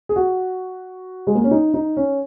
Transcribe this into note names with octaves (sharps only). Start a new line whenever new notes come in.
G#4
F#4
G#3
A#3
C#4
D#4
D#4
C#4